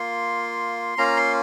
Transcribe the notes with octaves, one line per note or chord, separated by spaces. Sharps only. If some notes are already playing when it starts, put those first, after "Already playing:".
Already playing: A#3 F4 C6
A#3 C#4 F4 A#5
C6